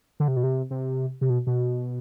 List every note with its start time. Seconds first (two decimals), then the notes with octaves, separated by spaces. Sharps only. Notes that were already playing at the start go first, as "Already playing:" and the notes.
0.20 D3
0.28 C3
0.36 B2
0.43 C3
0.70 C3
1.21 C3
1.30 B2
1.47 B2